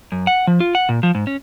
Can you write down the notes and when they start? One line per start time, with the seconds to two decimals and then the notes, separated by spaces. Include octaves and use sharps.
0.12 F#2
0.27 F#5
0.47 F3
0.60 F4
0.75 F#5
0.89 A#2
1.03 F3
1.15 G#2
1.27 C#4